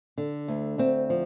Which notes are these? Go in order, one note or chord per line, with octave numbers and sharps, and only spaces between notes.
D3
D2
D2 C4
F3